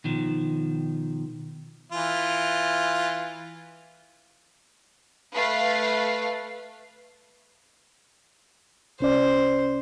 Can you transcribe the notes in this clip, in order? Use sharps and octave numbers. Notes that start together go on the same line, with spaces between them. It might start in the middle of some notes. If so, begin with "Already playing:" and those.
B2 D#3 F3
E3 F4
A3 B4 F5
C2 C#4 C5 D5